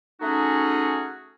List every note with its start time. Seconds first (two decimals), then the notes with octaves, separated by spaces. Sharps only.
0.21 A3 C#4 D#4 F#4 G#4